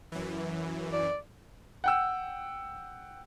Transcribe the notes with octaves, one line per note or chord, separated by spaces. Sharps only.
F#2 E3
D5
F#5 G5 E6